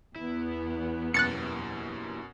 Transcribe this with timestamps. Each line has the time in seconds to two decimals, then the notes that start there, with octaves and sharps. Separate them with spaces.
0.16 E2 B3 E4
1.14 F#2 B2 A#3 E4 G4 F#6 A6 C#7